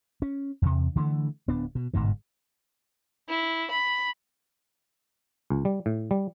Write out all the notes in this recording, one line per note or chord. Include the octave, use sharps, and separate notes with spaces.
C#4
E2 C3
D3 E3 G#3 A3
D1 B3 D4
B2
G1 G#2 B2 D#3
E4
B5
C#2
G3
A2
G3